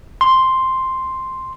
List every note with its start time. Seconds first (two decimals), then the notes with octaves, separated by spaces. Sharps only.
0.21 C6